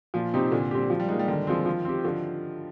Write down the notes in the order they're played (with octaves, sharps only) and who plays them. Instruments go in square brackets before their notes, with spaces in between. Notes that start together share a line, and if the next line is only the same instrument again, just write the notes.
[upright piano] A#2 [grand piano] F3
[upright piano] C3 [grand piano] C4 D#4 G4
[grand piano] A#2 [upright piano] D3
[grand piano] G3 C4 G4
F3
[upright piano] G3
[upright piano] G#3 [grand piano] A#3 D#4
[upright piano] G3
[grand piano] D3 [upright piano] D#3
[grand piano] F3 G#3 C4
F3
C4 G4
[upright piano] D3 [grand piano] F3